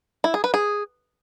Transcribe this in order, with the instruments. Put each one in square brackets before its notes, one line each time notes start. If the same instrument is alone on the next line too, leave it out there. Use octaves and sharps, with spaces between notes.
[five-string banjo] E4
G#4
B4
G#4